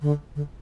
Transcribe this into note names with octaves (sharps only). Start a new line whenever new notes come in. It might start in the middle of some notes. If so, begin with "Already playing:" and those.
D3
D3